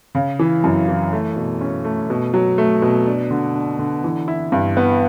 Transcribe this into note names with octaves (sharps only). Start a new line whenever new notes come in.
C#3
E3
F#2
E3
A3
B2
C#4
A3
B2
F#3
A3
B2
D4
D3
D4
D3
E3
E4
G2
B3